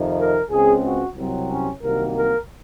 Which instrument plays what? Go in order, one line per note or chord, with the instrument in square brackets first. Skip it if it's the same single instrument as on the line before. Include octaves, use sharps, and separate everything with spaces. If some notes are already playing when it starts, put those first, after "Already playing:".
Already playing: [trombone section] F2 C3 D#3
A#4
C#2 C#3 G#3 C4 G#4
F#4
C2 C3 F#3 C4
C#4
C2 C3 D#3 F#3 A#3 A#4
A#4